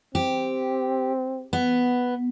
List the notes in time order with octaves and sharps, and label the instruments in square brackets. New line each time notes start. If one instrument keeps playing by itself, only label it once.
[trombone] C4 [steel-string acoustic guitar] G4
[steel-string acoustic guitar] B3